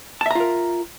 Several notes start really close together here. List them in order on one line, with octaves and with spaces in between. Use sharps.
A5 E5 A#5 F4 A#4